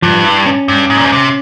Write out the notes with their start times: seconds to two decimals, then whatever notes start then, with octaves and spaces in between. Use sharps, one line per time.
0.02 G2 F3
0.24 E4
0.46 C#4
0.68 G2
0.90 G#2
0.98 A#2
1.05 G#2
1.12 C3